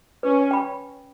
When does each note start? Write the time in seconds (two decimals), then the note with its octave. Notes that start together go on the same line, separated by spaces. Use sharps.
0.23 C#4 B4
0.51 G5 B5